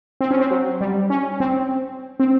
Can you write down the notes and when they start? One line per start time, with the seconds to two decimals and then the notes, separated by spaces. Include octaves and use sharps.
0.21 C4
0.31 C#4
0.40 C4
0.51 F#3
0.81 G3
1.10 C#4
1.40 C4
2.20 C4